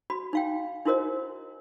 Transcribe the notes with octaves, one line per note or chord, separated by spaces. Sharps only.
F#4 B5
D#4 F5 G5
D#4 E4 F#4 A#4 C5 D#5